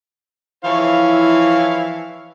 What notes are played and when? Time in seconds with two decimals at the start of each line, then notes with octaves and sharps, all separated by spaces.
0.64 E3 F3 E4 C#5 F5